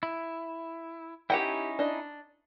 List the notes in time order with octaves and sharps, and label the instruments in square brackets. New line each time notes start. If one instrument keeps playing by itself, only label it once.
[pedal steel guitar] E4
[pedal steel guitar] C#4 D#4 E4 [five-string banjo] G4 F#5 G5
[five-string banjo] D4 D#5